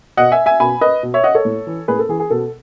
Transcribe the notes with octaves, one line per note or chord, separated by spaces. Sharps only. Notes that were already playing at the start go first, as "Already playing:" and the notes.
B2 D#5 F#5
E5 G#5
E5 G#5
B2 G#5 B5
B4 D#5
B2
C#5 E5
D#5 F#5
A4 C#5
A2
E3
A2 G#4 B4
A4
E3 G#4
G#4
B2 A4